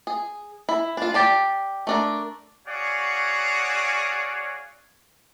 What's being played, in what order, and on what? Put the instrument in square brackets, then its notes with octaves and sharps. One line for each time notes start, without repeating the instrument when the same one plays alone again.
[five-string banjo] G#4
E4
D4 F4
G4 D5 A5
A3 D4 A#4
[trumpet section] F#4 G#4 C#5 D5 F5 F#5